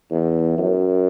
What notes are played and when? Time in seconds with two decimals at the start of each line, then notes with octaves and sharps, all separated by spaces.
0.11 E2
0.58 F#2